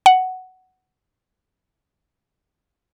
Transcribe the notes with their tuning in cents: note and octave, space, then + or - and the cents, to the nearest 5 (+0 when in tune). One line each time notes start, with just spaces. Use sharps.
F#5 +10